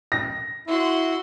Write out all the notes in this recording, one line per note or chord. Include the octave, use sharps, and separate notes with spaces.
A#6
E4 F#4 C6